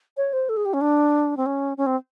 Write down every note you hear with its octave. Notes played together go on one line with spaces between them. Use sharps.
C#5
C5
A4
G#4
G4
C#4
D4
C4
C#4
C#4
C4